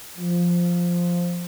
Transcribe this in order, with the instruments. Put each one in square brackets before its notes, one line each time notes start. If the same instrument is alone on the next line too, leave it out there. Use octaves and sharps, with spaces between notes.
[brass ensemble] F3